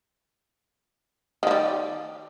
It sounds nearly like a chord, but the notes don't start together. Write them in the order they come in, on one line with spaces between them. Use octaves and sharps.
D#3 F3 G3